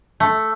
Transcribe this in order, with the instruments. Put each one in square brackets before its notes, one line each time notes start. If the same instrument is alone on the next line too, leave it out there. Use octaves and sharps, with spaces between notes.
[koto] A3